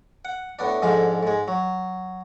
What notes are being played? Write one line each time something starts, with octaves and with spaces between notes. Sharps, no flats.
F#5
A2 B3 D4
F2 G#2 D3 F3 G#3 F5
G#2 G#3
F#3